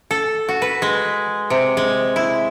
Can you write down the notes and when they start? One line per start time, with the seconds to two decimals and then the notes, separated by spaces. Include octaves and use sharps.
0.11 A4
0.49 F#4
0.62 B4
0.82 G#3
1.50 C3
1.77 G#3
2.16 E4